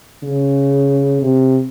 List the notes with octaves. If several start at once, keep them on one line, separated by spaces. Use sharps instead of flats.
C#3
C3